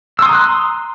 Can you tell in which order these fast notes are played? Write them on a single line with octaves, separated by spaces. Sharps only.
E6 C6 D#6 A#5 F#6